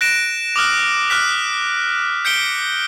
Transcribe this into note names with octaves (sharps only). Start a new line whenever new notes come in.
F#6 A#6 D7 E7
D6 D#6 F6 F#6
D6 F6 F#6 B6
G6 B6 C#7 D7 G7